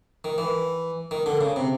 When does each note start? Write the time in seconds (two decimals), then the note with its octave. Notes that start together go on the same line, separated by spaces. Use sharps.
0.24 D#3
0.38 E3
1.11 D#3
1.26 D3
1.41 C#3
1.56 C3